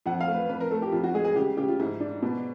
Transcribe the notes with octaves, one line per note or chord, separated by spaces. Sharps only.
F2 F#5
F5
A3
B4
F2 B4
A#4
A3 A4
G4
F2 F4
F#4
G#3 G#4
G#4
C#3 G4
C#3 G4
F4
G#2 E4
D4
B2